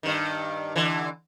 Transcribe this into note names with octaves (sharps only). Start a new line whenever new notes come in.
G2 D#3
D3 E3